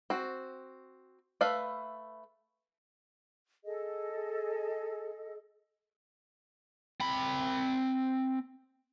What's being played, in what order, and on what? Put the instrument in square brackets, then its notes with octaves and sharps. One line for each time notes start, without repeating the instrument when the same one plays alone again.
[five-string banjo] C4 F#4
A3 B4 E5 F5
[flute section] G#4 A4 D#5
[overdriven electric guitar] C4 B5